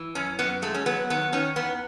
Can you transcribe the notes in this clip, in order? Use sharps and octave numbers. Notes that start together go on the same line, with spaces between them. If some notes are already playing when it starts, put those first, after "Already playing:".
Already playing: E3
F#2 C#4
F#2 B3
G#3 A3
C#4
F#3 B3
D#3 B3
D#3 C#4
E2 B3